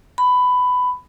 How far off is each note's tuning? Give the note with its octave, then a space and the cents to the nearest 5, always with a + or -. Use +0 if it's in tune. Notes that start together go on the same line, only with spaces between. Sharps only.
B5 +15